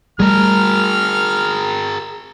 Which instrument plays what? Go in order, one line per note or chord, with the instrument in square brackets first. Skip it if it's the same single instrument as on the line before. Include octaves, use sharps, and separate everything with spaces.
[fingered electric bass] G3 A3 [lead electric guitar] G#4 A#4 [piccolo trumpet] F6